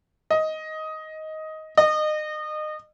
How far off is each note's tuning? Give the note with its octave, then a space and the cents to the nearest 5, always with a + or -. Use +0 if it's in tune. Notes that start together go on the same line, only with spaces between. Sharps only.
D#5 +10
D#5 -30